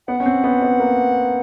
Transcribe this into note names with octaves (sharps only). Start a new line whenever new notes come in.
B3 F#5
C#4
C4
B3
B3
A#3